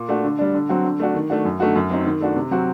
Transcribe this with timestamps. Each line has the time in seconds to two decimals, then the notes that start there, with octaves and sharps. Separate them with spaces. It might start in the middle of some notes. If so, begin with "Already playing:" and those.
Already playing: A#2
0.09 A3 D4 F#4
0.24 D3
0.39 G3 D4
0.54 D3
0.69 F#3 C4 F#4
0.84 D3
1.00 A3 D4 F#4
1.15 D#3
1.30 A3 D4 F#4
1.45 F#2
1.60 D3 A3 D#4 F#4
1.76 F#2
1.90 F#3 C4 D#4
2.06 D#3
2.21 A3 D4 F#4
2.36 C3
2.51 F#3 C4 F#4